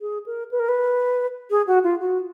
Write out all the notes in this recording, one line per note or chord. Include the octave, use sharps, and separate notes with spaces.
G#4
A#4
B4
A#4
B4
G#4
F#4
F4
F#4